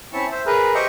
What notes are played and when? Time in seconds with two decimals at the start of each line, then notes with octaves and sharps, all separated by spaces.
0.13 C4 C#4 E4 A5 C#6
0.31 C5 E5
0.46 G#4 A#4 B4
0.75 G4 C5 D#5 E5 G5 C#6